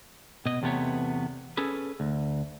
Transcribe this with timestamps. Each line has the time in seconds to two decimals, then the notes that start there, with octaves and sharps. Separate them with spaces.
0.46 B2 D#5
0.62 E2 C3 A3 B3 C#5
1.57 C#4 G#4 A4 B4
2.00 D2